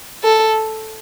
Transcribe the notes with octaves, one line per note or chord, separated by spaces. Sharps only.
A4